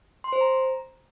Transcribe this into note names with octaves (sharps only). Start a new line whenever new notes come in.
C6
C5
A#5